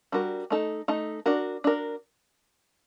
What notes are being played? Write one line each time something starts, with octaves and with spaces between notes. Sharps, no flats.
G3 D4 F#4 A#4
A3 D#4 A4
A3 D#4 A4
D4 F#4 A#4
D4 F#4 A#4